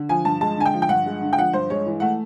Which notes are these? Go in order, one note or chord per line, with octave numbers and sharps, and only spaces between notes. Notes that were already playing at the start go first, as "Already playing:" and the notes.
Already playing: D3
F3 G#5
G2 A5
G#3 A5
D3 G#5
G5
F3
G5
G2 F#5
G#3
D3
G5
F3 F#5
G2 C5
G#3 C#5
E3
A3 F#5